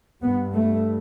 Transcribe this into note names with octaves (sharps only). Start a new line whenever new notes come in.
G2 B3
A3